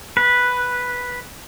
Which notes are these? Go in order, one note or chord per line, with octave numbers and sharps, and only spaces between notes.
B4